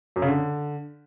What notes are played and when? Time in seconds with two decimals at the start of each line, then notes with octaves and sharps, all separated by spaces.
0.16 F#2
0.22 C#3
0.28 D3